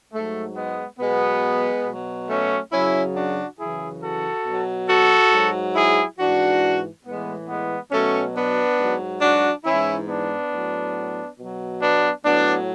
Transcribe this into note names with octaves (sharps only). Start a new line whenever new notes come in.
G#2 F#3 A3
G#3 B3
B2 F#3 G#3 B3
B2 F#3
A3 C#4
F#2 C#3 F#3 C#4 E4
D4 F#4
F#2 C#3 E3 E4 G#4
F#4 A4
B2 F#3
F#4 A4
G#2 F#3
E4 G#4
G#2 E3 D4 F#4
A2 E3 G#3 B3
G#3 B3
B2 F#3 A3 C#4
B3 D4
G#2 F#3
D4 F#4
G#2 E3 C#4 E4
B3 D4
A2 F#3
B2 F#3
B3 D4
A2 F#3 B3 D4